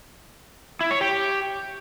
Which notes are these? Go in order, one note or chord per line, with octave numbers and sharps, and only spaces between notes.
E4
C#5
G4